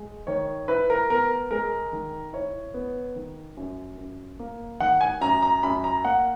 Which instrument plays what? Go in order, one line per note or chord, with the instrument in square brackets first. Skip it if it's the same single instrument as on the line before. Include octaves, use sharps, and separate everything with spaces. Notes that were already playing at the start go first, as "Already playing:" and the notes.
Already playing: [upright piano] G#3
D#3 C#5
E4 B4
A#4
B3 A#4
G#3 A#4
D#3
E4 C#5
B3
D#3
F#2
F#2
A#3
D#3 F#5
G#5
F#2 A#5
A#5
F#2 B5
A#5
A#3 F#5